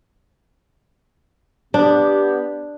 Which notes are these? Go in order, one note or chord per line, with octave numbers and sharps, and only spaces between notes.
B3 D4 G4